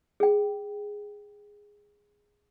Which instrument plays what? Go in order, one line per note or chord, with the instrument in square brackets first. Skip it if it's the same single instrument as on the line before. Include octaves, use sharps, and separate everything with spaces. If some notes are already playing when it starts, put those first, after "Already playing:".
[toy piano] G#4 G5